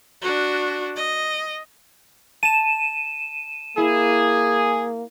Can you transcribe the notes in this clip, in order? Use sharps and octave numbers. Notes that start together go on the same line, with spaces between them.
D4 F#4
D#5
A5 D#7 E7
A#3 E4 G#4